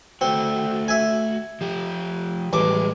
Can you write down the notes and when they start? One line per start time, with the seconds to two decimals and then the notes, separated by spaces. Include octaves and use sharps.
0.21 A3 C4 F#4
0.88 E5 G#5
1.61 F3 G4
2.53 A1 G3 G#3 C#6 D6